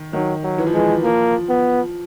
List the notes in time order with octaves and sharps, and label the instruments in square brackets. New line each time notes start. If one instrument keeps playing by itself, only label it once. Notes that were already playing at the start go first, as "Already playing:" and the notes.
Already playing: [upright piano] D#3
[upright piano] D#3 [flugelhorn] F#3
[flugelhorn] F#3
[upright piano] E3
F3
[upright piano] E3 [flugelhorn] G#3
[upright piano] F3 [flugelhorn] A#3
[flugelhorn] B3